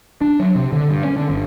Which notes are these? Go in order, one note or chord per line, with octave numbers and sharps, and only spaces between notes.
D4
F#3
C3
D3
G2
C#4
D3
G1